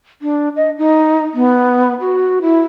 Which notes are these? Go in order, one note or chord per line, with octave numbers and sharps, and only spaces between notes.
D4
D#5
D#4
B3
F#4
E4